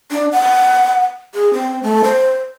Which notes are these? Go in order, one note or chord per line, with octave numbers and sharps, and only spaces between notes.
D4
F#5
G#4
C4
A3
C5